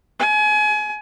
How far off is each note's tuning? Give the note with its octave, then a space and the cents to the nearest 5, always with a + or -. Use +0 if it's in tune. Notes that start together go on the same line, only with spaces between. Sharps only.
G#5 +30